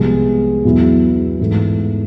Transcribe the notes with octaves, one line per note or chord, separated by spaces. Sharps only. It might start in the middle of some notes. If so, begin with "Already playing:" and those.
Already playing: C2 C3 F3 G#3 B3
E2 B2 F#3 B3 E4
G#2 E3 A3